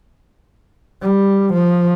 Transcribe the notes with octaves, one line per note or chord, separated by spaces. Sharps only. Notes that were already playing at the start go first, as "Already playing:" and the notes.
G3
F3